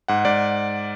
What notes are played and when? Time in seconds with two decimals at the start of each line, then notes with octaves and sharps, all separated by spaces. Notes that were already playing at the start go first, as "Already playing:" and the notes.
0.08 G#2 F#5
0.25 G#2 D5